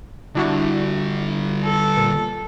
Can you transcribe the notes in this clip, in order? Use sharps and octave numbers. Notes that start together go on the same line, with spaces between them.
D3 G3 D4 E4 F#4
A4
A#2